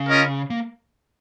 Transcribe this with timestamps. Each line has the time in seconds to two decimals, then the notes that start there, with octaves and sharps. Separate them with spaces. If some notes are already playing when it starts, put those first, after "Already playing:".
Already playing: C#3
0.09 C#4 F4 A#4 D#5
0.50 A#3